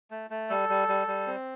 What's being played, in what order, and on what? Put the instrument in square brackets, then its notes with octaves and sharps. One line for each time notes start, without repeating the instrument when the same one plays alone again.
[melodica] A3
A3
G3 A4
G3
G3
G3
C4